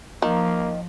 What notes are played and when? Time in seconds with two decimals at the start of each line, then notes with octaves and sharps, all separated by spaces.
0.22 D#3 F3 A#3